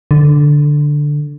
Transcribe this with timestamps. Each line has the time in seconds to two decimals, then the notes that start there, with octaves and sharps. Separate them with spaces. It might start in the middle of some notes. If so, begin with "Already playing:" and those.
0.11 D3